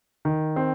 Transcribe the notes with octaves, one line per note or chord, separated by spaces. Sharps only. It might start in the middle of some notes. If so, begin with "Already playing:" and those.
D#3
C4